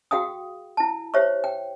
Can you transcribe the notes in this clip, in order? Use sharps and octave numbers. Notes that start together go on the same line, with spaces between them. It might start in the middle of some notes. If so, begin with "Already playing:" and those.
F#4 G#4 F5 G5 D#6
E4 A5
G4 C5 C#5 E5 C#6
G5